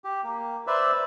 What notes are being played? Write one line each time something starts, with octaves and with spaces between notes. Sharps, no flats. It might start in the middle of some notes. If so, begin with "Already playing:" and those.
G4
A#3
B4 C5 D5 E5